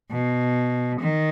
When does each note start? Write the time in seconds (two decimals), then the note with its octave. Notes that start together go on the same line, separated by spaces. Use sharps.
0.11 B2
1.01 D#3